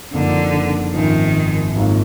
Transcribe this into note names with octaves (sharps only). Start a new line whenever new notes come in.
F#1 F2 D3 F3 A#3 D#4
G#1 F#2 D#3 F3
G#1 G#2 F#3 A#3 F4